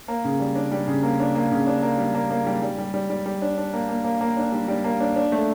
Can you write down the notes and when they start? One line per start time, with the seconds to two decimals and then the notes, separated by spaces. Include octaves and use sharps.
0.08 A#3
0.24 C#3
0.40 G3
0.55 D4
0.71 G3
0.88 C#3
1.03 A#3
1.20 D4
1.35 A#3
1.52 C#3
1.67 D4
1.83 A#3
1.98 G3
2.14 A#3
2.31 A#3
2.47 G3
2.62 G3
2.78 G3
2.94 G3
3.10 G3
3.26 G3
3.42 D4
3.57 D4
3.73 A#3
3.89 A#3
4.04 A#3
4.21 A#3
4.37 D4
4.52 G3
4.68 G3
4.84 A#3
5.00 D4
5.16 D4
5.32 A3